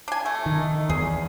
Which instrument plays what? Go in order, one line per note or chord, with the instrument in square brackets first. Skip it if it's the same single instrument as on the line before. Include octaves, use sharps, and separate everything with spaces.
[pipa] D4 G#5
A3
[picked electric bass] D#3
[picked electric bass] E2 [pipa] G#4